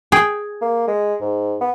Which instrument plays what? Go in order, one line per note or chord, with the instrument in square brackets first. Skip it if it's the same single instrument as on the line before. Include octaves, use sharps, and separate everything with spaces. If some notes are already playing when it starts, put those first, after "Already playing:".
[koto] G#4 G5
[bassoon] A#3
G#3
G#2
B3